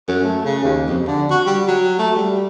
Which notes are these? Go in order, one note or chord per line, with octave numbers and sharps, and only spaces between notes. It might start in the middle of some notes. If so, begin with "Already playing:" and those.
F#2
A3
C#3
D#2
F2
D3
F#4
G3
F#3
A3
G3